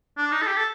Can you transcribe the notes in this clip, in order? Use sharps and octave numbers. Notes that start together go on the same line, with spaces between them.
D4
D#4
A4
G4
A4